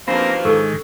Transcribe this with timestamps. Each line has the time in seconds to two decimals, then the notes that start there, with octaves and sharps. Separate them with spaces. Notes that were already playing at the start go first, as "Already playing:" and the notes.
0.08 D#2 B2 F3 A#3 C4 D4 B5
0.45 G#2 D#3 A4 C#6 E6